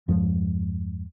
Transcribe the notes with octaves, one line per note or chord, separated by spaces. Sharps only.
E2 G2 F3 G#3